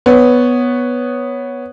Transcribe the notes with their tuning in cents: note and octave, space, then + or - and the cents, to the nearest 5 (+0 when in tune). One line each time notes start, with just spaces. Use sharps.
B3 +0 C#5 +0